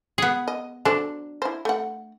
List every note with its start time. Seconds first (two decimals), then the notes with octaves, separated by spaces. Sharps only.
0.18 B3 G#4
0.48 D#5
0.85 F#3 D4 A4 C5
1.42 E4 C5
1.65 A3 F#5